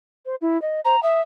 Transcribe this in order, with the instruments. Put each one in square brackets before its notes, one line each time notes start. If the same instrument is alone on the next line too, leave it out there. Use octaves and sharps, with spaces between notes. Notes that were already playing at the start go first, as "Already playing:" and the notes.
[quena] C5
E4
D#5
[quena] C5 [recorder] A#5
[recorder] E5 [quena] D#6